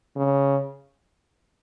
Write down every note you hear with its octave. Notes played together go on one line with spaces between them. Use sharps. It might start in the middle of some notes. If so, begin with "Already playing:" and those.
C#3